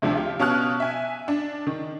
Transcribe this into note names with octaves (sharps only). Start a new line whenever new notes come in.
D2 C3 F3 D4
F4 G4
B2 C#4 F5 A5 F6 F#6
E5 G#5
D4
D#3